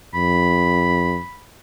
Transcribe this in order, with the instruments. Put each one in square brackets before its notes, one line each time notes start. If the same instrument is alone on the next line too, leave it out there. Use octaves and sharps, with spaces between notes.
[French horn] F2 [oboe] B5